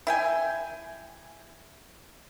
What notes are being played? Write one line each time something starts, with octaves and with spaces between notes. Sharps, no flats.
E4 G5 G#5